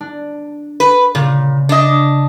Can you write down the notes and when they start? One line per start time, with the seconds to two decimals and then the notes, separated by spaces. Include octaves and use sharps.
0.01 D4
0.80 B4
1.15 A#2 C#3
1.69 D4 D#5